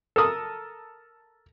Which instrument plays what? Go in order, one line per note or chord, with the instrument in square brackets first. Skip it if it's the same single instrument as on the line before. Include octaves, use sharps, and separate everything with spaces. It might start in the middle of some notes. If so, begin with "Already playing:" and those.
[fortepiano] A4 A#4 D#6